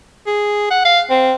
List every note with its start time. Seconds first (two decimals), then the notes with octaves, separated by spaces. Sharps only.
0.27 G#4
0.70 F#5
0.85 F5
1.10 C4